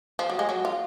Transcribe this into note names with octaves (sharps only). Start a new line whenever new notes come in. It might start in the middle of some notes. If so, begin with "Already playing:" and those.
F3
F#3
G#3
F#3
F4